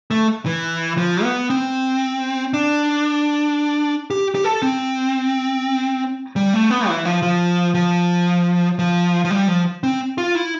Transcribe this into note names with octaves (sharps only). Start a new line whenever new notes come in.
A3
E3
F3
B3
C4
D4
G4
G4
A4
C4
G3
A3
B3
E3
F3
F3
F3
F3
F3
G3
F3
C4
F4
E4